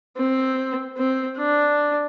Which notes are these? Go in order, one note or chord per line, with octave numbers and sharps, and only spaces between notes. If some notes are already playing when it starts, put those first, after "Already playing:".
C4
C4
D4